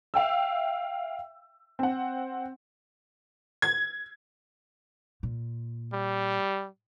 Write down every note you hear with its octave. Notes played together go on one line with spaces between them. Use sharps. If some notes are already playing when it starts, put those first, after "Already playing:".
E5 F5 G5 E6
C4 F#5
G#6
A#2
G3